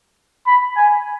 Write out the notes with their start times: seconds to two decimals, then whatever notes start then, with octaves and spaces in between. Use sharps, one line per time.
0.46 B5
0.77 G#5